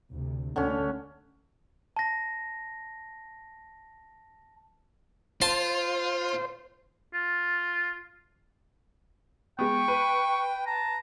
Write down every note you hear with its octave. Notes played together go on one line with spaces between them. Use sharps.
D2 C3
D2 D3 A3 C#4
A5 A#6
F4 C5 A5 C6
F4
G#3 B3 G5 C#6
B4
A5 A#5